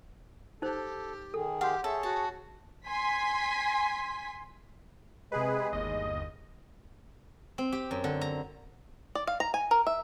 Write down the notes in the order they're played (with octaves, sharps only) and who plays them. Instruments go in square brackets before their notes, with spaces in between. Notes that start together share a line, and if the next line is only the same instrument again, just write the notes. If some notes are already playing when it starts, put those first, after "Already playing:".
[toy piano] D#4 C5 [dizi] G4 [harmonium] A4
[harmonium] D#3 G#4 [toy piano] A4
[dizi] G4 [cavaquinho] F5 [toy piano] F#5 C6
[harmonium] G#4 C#5 [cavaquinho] A4 [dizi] E5
[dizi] F#4 [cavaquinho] A5
[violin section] G#5 C6 B6
[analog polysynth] C3 G#4 B4 [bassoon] G#3
[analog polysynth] G1 D#2 D#5
[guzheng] C4
G4
F#2
D3
A#5
[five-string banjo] D5
F5
A#5
G#5
A#4
E5